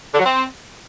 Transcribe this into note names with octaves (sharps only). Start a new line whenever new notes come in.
D3
F#3
C4